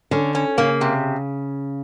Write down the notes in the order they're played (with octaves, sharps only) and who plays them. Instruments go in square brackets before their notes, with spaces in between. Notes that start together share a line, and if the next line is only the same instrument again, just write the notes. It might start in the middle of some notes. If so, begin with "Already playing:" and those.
[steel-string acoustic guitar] D3 [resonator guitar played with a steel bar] C#4
[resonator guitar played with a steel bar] C#4
[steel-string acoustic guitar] C#3 [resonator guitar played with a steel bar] A#3
[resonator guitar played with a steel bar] C3